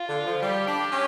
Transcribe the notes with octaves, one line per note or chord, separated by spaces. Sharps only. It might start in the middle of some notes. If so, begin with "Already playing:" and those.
Already playing: F4
D3
F3
G3 G4
D4
C#4